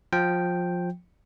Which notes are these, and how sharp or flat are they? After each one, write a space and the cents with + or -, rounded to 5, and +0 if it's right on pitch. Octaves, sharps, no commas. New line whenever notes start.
F3 +20 G5 +0